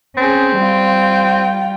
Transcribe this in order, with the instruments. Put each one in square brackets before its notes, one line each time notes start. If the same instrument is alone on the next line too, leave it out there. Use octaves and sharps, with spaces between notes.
[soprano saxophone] C4 [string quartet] C#4 G#4
[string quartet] G3 F4 G5